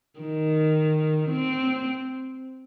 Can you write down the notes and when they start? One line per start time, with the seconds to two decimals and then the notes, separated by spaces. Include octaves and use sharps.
0.20 D#3
1.30 C4